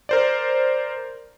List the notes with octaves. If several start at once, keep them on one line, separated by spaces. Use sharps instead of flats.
A#4 C5 D5